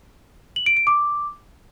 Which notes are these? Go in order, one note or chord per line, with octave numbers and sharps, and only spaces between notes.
F#7
D7
D7
D6